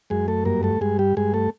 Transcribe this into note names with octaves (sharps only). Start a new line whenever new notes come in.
F#2 G#3 G#4
A3 A4
G2 A#3 A#4
A3 A4
G2 G#3 G#4
G3 G4
G2 G#3 G#4
A3 A4